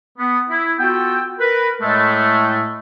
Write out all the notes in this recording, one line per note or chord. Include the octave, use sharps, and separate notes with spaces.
B3
E4
B3 F4 F#4 A4 G5
A#4 B4
A2 G#3 A3